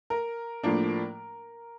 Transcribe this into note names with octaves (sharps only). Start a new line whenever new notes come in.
A#4
A2 F3 A#3 D4